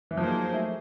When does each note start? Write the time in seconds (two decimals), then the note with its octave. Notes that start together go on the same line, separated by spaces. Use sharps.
0.11 E3
0.17 F3 F#3 A#3 D#4 G#4 C5
0.53 A3